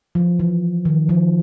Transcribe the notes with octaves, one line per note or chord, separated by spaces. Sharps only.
F3
E3
D#3
F3